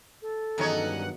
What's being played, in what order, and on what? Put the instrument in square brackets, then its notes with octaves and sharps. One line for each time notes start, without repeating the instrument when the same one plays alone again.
[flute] A4
[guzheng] E2 D#3 F#3 [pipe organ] G2 F#5 [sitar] C#4 D#4 C#5